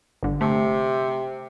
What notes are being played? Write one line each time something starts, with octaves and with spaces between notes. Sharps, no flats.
G1 D3
C3 A3